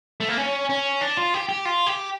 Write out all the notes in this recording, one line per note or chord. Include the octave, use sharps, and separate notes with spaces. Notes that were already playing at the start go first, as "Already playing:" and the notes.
A3
A#3
C#4
C#4
D4
F4
G4
G4
F4
G4